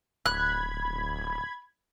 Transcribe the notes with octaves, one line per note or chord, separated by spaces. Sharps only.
D1 B5 F#6 G#6